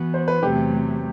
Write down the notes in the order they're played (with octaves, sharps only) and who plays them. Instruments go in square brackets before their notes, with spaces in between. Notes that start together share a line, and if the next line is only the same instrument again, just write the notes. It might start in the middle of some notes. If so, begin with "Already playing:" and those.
Already playing: [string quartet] E3 B3 F#4
[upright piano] C5
B4
[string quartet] E2 C3 F#3 A3 [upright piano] G4